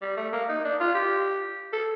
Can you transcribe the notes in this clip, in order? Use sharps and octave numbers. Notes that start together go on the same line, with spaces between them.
G3
A3
A#3
D#4
D4
F4
G4
A4